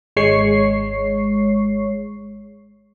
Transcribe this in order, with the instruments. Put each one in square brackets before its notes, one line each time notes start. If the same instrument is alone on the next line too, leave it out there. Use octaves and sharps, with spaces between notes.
[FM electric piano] G#1 G#3 C#5 C#6 C7